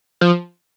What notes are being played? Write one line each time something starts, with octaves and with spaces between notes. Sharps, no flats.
F3